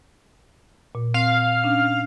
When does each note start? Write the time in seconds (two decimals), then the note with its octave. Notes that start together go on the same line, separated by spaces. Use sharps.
0.95 A#2
1.14 C4 F5
1.64 C#4 D4